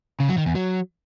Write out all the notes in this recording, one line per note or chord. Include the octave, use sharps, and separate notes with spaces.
C#3
F#3
D#3
E2
F#3